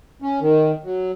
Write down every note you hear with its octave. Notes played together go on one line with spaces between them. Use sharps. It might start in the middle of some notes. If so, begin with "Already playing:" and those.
C#4
D#3
F#3